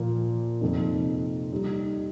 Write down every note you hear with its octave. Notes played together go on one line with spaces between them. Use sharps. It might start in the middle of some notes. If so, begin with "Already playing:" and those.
Already playing: A#2 F3 A#3
F2 C3 F3 A#3 D#4
G3 D#4 G4